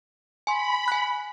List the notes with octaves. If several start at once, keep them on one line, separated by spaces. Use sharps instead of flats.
G#5 B5 C6
G#5 F#6